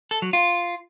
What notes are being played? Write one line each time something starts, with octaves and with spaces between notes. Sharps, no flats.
A4
F#3
F4